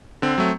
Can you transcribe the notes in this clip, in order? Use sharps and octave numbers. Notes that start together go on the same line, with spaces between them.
D3 C4
F#3 A3